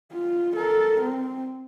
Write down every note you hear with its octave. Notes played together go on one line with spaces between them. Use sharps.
F4
A4 A#4
C4